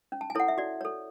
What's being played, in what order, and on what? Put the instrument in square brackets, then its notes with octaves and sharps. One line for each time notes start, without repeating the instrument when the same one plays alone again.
[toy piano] C#4
A5
G#5
E4 A4 C#5 F#5
E5
F#4 D5
A4 C#5